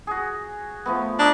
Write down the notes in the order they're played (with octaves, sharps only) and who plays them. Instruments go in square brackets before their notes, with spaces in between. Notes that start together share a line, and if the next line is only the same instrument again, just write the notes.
[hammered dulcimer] F#4 G#4
F3 A3 B3
[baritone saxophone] D4 [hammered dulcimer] D#4